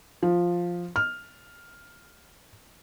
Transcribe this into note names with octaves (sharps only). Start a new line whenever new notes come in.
F3
F6